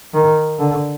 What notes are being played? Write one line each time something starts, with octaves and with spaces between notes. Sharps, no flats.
D#3
D3